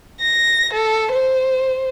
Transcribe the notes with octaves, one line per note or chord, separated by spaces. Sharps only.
A#6
A4
C5